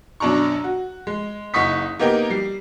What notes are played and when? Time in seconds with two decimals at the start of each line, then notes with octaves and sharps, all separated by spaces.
0.20 F#2 B2 D4 A#5 C#6
0.64 F#4
1.07 G#3
1.54 F#1 D#4 F#5 C#6 D#6 B6
1.99 A#3 B3 D#4 G4 A#4
2.30 G3 C7